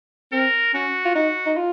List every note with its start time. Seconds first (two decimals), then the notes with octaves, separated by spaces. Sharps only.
0.32 C4 A#4
0.74 C#4 F#4
1.05 F4
1.15 D#4 F#4
1.46 D#4
1.57 F4